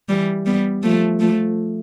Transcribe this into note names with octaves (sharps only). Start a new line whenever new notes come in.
E3 G3
G3 B3
F3 A3
F3 A3